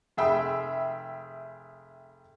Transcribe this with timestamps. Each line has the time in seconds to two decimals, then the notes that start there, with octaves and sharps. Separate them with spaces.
0.17 F1 G#4 E5 G5 B5